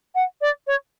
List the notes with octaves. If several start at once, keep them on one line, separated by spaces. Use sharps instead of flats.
F#5
D5
C#5